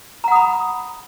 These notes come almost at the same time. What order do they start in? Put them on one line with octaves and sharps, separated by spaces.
A#5 F#5 D#6 B5